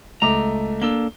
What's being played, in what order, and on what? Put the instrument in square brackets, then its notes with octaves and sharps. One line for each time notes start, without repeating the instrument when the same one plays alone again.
[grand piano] C#2 A3 D6 [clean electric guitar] A#5
[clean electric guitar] A#3 D4 A4 [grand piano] G7